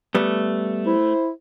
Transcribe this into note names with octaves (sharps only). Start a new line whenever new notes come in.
G3 A3 B3
E4 C5